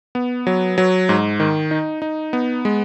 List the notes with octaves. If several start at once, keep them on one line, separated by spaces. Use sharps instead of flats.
B3
F#3
F#3
G#2
D#3
D#4
D#4
B3
G#3